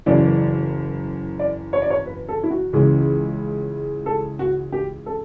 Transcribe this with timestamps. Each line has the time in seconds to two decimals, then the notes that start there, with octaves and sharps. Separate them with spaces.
0.06 F#1 F#2 E3 D5
1.39 D5
1.73 C#5
1.82 D5
1.90 C#5
2.06 B4
2.29 A4
2.43 E4
2.51 F#4
2.73 C#2 C#3 E3
4.06 A4
4.39 F#4
4.72 G4
5.06 A4